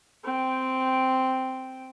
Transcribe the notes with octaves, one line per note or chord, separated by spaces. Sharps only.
C4 G5